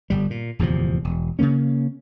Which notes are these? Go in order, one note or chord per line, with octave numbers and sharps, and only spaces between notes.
G1 G3
A#2
D1 E2 C3 F3
E1
C#3 F#3 A#3 C#4